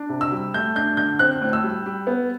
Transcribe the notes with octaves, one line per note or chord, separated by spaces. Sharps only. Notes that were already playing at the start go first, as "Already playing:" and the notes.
Already playing: D4
C3
E6
G3
A3 G6
D4 G6
D3 G6
C4 F#6
A2
E6
G3
G3
B3